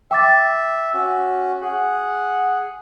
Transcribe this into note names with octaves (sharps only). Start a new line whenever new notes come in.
E5 G5 D6 A6
C#4 F#4
G#4 F#5